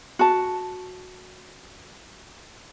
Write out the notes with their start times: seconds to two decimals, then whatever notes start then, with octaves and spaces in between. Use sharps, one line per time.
0.19 F#4 A5